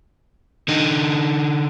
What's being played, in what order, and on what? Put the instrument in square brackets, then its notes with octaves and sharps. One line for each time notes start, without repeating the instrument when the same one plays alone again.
[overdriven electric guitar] D3 D#4